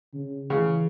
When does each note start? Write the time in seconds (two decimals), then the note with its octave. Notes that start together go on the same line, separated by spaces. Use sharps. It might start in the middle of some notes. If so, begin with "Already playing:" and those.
0.14 C#3
0.50 C#3 E3